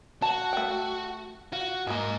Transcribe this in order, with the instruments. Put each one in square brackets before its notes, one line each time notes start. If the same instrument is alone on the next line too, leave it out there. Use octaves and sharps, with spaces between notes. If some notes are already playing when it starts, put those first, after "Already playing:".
[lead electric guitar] F#4 [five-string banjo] A5
[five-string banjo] A3 G5
[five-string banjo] F4 [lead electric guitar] F#4
[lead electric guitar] G#2 D#5 [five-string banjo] G#3 A#3